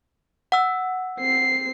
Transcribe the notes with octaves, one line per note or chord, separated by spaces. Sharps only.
F#5 E6
C4 C7